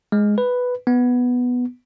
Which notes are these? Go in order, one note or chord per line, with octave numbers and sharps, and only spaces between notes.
G#3
B4
B3